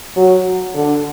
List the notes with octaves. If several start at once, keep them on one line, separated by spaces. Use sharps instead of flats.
F#3
D3